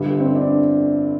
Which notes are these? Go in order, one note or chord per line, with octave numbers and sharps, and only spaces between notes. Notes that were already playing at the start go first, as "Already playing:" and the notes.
Already playing: G1 G2 D3 G3
C4
D4